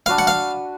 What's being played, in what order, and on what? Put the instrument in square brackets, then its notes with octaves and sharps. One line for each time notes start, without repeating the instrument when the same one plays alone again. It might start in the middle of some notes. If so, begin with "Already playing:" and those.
[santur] D4 F#4 B4 [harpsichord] F5
[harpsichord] F#5
F5